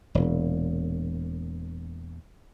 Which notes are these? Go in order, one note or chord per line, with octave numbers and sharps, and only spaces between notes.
E1 A#2